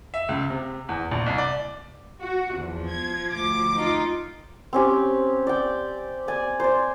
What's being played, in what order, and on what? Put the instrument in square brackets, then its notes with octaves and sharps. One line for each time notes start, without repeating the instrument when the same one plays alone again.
[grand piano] E5
C#2
C3
E2
A#1
C2
D5
[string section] F#4
[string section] E2 [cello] F3
[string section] G#6
D2 D6
[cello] D#4 F4
[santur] C4 C#4 G4
D5 G5
D5 G#5
C5 D5